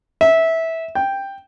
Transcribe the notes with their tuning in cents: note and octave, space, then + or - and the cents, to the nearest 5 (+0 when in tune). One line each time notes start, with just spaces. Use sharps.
E5 -15
G5 +5